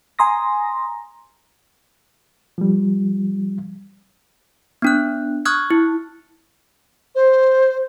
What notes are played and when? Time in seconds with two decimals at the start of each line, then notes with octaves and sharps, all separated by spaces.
0.19 G#5 A#5 C6 D#6 A#6
2.58 F3 G3
4.82 B3 D4 F#6
5.45 C#6 D#6 F6 F#6 G#6
5.70 E4
7.15 C5